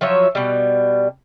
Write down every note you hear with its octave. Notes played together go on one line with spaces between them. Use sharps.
F3 F#3 C#5 E5
B2 G3